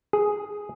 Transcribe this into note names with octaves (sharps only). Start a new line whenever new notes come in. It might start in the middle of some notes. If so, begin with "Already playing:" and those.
G#4